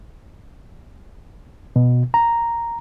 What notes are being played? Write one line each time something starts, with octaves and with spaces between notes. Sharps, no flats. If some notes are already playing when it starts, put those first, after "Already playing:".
B2
A#5